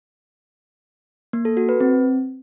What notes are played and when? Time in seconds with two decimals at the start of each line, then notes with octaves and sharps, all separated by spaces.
1.33 A#3
1.45 A4
1.57 F#4
1.69 B4
1.80 C4